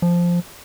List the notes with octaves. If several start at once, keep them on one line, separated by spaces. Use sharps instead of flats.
F3